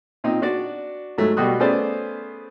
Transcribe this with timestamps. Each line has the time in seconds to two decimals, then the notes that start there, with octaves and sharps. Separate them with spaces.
0.24 A#2 C4 D#4
0.42 D4 F#4 D5
1.18 G#2 F#3 A3
1.37 B2 G3 F#4 D#6 F#6
1.60 A3 B3 C#4 G#4 C5 D5